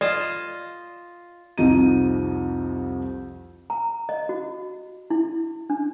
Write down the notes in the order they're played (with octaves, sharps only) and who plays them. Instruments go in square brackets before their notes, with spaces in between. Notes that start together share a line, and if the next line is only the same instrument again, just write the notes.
[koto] F4 D#5 A5 [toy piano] D5
[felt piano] C2 F2 F3 D#4 D#7
[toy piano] A#5
D#5
F#4
E4
D4